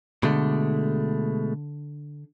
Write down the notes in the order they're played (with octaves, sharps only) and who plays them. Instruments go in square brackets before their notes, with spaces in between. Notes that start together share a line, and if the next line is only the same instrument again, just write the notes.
[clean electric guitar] B2 G#3 A3 [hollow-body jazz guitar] D3